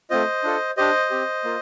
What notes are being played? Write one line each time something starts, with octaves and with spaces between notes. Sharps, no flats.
A3 C4 F4 C5 D#5
D4 F4 A4
D4 G4 C5 D#5
C4 G4
A#3 F4